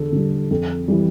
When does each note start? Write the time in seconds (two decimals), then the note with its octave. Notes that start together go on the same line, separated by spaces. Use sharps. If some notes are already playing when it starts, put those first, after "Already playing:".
Already playing: E2 D3 A4
0.12 D3 G3
0.51 F2
0.88 E3 G3